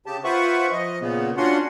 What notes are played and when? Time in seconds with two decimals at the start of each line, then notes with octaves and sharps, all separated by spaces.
0.06 C#3 G4 A5
0.24 F4 B4 C5 E5 F#5 C#6
0.72 F3 D#5
1.01 A#2 C#3 B3
1.37 C#4 D4 F4 F#4 F#5 C6